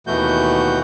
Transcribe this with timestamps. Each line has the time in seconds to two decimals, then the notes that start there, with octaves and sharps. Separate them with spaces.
0.07 D#2 B2 E3 A3 F#4 G6